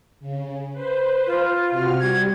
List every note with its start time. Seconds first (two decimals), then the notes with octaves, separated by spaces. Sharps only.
0.20 C#3
0.72 B4 C5
1.27 F4
1.71 C3 F#4 F6
2.00 G3 G#6